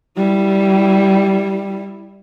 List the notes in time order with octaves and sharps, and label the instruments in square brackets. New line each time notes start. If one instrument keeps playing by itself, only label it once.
[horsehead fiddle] G3 E4